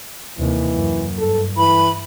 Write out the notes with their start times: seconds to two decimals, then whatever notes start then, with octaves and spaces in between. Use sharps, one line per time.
0.39 D#2 C3 E3
0.75 F#2
1.19 G2 A4
1.57 E3 B5